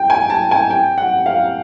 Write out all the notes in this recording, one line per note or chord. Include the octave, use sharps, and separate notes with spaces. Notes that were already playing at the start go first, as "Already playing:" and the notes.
Already playing: G5
G#5
A5
G#5
G5
F#5
F5